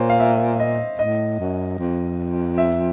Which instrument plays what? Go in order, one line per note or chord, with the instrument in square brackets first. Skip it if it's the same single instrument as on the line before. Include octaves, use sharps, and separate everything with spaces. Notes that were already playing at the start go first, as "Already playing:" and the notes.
Already playing: [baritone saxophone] A#2 [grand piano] C5 C#5
[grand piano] F5
E5
D#5
[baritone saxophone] A2 [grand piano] D#5
[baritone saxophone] F#2
F2
[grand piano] E5